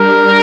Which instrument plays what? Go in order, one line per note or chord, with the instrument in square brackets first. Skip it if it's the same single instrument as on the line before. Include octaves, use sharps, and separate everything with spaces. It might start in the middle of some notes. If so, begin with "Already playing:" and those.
Already playing: [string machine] G3 D4 G4 [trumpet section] A#4